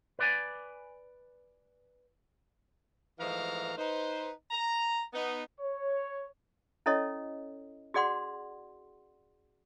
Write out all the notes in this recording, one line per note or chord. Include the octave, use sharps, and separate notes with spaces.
B4 D5 G#5
G#2 E3 F3 A3 F5 A#5
D#4 B4 C5
A#5
B3 D#4
C#5
C#4 E4 A4 C#5 D#5
F#4 G#4 D5 F#5 C6